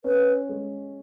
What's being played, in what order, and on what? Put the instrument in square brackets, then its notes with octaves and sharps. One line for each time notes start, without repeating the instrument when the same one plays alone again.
[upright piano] C#4 [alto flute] B4
[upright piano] G#3